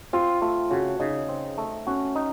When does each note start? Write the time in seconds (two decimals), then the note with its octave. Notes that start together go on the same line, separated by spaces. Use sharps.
0.13 C4 F4
0.41 A3 F4
0.71 C#3 F#4
1.00 C#3 D#4
1.29 C4
1.58 A3
1.87 C#4 F#4
2.15 D#4